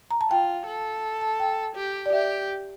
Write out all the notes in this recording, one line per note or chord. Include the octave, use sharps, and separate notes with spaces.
A#5
A5
F4 G5
A4
A5
G5
G4
D5
G4 E5